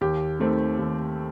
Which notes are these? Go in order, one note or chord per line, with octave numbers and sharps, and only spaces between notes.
D#2 G4
D#3 A3 C4
D#2